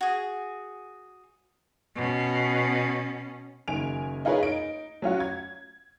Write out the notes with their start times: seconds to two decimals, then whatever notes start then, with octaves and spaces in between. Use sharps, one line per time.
0.01 F#4 G#4
1.96 B2 C#4
3.68 F#1 D#3 G#5 D7 F7
4.25 D#4 F4 G#4 A#4 B4 C#5
4.43 D#4 D7
5.02 F#3 C#4 F4 F#4
5.20 G#6